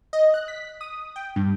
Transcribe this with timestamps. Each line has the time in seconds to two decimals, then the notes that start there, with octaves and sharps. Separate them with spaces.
0.13 D#5
0.34 F#6
0.48 B6
0.81 D#6
1.16 G5
1.36 G2